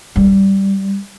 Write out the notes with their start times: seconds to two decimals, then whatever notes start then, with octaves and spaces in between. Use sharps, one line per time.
0.16 G3